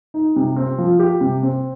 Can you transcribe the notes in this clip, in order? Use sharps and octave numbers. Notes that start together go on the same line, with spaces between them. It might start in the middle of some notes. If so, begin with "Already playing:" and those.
D#4
C3
C4
F3
G4
C3
C4